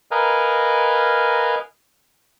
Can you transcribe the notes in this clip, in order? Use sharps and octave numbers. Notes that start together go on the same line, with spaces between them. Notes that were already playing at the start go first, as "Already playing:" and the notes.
A#4 B4 D#5 F5 G#5 A#5